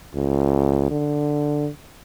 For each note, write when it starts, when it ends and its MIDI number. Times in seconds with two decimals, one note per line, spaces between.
0.14 0.88 37
0.90 1.69 50